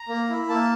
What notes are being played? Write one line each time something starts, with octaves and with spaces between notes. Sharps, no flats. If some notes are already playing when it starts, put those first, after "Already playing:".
Already playing: A#5
A#3
E4
A#3 A5